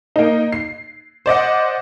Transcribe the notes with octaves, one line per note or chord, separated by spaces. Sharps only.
A#3 D#4
C7
C5 D5 D#5 F#5